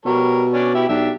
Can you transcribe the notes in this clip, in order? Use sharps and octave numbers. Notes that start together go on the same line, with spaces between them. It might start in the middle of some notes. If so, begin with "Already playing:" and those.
B2 G3 A#4 C#5
C#4 D4 D5
E4 G4 E5
B1 D4 G4 E5